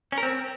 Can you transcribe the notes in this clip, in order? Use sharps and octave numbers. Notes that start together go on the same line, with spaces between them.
C#4
A#4
C4